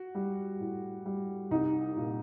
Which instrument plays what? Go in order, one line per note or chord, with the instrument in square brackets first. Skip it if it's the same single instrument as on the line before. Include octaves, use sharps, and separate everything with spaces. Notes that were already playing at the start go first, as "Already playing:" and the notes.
Already playing: [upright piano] F#4
G3
A2
G3
C2 D#4
A#2